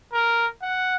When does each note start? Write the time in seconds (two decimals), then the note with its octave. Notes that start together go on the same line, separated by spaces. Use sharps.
0.13 A#4
0.62 F#5